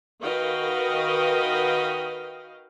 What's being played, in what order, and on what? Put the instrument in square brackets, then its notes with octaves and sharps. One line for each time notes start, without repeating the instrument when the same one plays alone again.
[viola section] D#3 F#4 B4 D#5 F5 G5